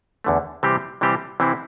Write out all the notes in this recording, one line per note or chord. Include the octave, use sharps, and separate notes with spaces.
E2 D3 A3
C3 E3 G3 C4 G4
C3 E3 G3 C4 G4
C3 E3 C4 E4